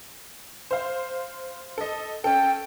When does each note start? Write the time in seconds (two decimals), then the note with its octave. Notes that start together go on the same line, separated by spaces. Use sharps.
0.71 C5 F5
1.78 A4 D#5
2.24 C#4 A4 G5